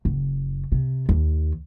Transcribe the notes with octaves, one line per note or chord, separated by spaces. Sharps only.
F#1
C3
D#2